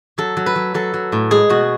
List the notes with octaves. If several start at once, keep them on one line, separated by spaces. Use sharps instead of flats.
F#3 A4
F#3
B4
F#3
F#3 A4
F#3
A2
G#3 G#4
B2 F#4